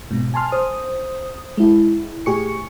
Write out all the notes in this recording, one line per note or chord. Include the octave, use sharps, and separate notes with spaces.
G#2 B2
G#5 A5 C6 F6
C5 D#6
G#3 E4
A2 G4 G#4 C#6 C#7